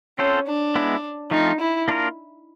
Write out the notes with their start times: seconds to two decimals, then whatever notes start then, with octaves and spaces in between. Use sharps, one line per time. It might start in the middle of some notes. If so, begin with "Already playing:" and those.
0.19 C4 C#4 F4 A4 C5
0.47 D4
0.75 G#3 B3 E4
1.31 F3 A3 C4 D#4 F4
1.60 E4
1.88 A#3 D4 F4 A#4